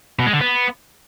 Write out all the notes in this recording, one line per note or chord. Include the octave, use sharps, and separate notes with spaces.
B2
G#3
D3
B3